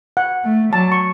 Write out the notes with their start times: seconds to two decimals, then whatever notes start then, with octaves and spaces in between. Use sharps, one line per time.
0.17 F#5
0.44 A3
0.73 F#3 A5
0.92 C#6